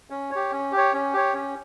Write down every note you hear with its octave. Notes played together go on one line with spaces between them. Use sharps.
C#4
G4 C#5
C#4
G4
C#5
C#4
G4 C#5
C#4